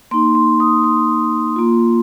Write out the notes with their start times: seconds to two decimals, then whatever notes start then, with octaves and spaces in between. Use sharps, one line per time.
0.11 A#3 D#4 C6
0.35 C6
0.60 D#6
0.84 C6
1.56 A#3 F4